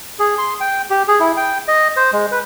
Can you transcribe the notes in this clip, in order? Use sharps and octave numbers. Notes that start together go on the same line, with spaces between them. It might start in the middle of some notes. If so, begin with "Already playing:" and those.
G#4
C6
G5
G4
G#4
E4
G5
D#5
C5
G#3
B4